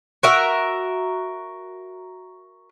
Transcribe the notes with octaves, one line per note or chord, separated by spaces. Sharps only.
F#4 A#4 E5